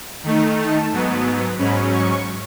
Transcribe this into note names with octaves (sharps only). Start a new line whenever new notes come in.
D#3 A3 D#4
A5
G#2 F#3 B3
G#2 F#3 C#4 B5
C#6